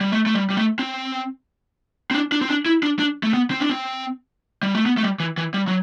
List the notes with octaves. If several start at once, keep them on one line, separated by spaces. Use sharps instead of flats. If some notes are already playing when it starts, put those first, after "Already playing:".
G3
A3
A3
G3
G3
A3
C4
C4
D4
D4
C4
D4
E4
D4
D4
A3
B3
C4
D4
C4
G3
A3
B3
A3
G3
E3
E3
G3
F#3